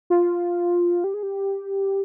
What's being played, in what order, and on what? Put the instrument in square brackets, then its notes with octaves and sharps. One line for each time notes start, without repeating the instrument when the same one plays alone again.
[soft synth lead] F4
G4
G#4
G4